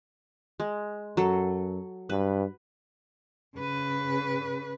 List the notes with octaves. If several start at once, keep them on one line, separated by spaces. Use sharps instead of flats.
G#3
F#2 F#3 A4
G2 B4
C#3 B4